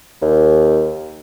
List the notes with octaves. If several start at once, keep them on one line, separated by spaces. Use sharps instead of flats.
D#2